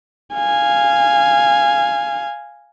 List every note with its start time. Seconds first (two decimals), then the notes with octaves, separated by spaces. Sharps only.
0.35 F5 G#5